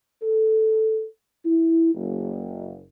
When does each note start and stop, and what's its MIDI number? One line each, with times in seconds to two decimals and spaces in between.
0.22 1.04 69
1.45 1.92 64
1.94 2.82 30